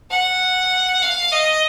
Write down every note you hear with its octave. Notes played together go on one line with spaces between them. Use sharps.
F#5
F5
D#5